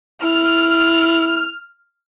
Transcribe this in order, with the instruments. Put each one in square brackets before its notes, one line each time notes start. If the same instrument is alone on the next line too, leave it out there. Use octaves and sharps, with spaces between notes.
[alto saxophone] E4 [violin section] F6